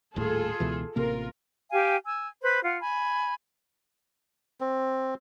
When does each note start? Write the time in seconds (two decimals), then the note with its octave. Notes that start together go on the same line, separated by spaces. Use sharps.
0.16 D#1 D#2 A2 F4 G#4 A4
0.60 C#2 B2 E3
0.96 A1 C3 A#3 F4 A#4
1.71 G4 F5 G5 G#5
2.06 G#5 E6
2.42 B4 C5 B5
2.64 F4 F#5
2.81 G#5 B5
4.61 C4